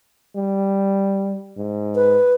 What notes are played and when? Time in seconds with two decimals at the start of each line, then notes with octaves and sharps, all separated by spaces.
0.36 G3
1.57 G#2
1.95 B4